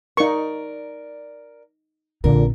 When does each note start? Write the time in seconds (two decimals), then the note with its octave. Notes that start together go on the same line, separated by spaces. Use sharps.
0.17 D#4 A#4 D5 C#6
2.24 A#1 A#2 D3 C4 A#4